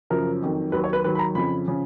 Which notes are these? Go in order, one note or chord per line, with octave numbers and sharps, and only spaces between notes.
F#2 C#3 F3 A#4
F2 D#3 F#3
D#2 D#3 F#3 B4
C#5
B4
D#2 D#3 F#3 B4
B5
A#5
F2 C#3 F3 B5
C#3 F3